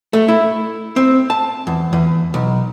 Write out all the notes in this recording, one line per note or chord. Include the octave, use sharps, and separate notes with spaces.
A3
E4
C4
A5
E2
E2
B1